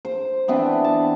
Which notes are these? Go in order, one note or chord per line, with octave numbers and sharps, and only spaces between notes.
C5
E3 B3 C4 D4
A5